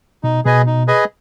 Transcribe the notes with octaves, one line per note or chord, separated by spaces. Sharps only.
B2 D#4
B2 G#4 B4 D#5 G#5
D#4
G#4 B4 D#5 G#5